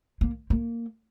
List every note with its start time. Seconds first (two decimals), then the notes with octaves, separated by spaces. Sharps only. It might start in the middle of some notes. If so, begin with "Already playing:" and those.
0.21 A#3
0.50 A#3